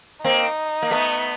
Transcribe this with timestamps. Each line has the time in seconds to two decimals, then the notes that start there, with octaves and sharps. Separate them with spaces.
0.24 A#3 C4 D#4
0.82 A#3
0.91 A3 B3